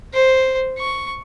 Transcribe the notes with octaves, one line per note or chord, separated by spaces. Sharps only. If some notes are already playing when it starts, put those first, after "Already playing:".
C5
C#6